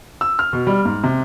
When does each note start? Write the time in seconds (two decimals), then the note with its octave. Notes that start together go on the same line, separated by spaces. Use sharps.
0.21 E6
0.39 F6
0.53 B2
0.67 G3
0.85 G#2
1.04 C3